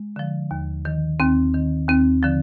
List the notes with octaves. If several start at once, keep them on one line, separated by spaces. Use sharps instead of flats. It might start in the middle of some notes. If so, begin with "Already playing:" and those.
Already playing: G#3
D3 F3
D#2
D#3
D#2 C4
D#3
D#2 C4
D3 F3